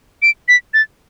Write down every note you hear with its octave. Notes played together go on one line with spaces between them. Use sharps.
D7
B6
A6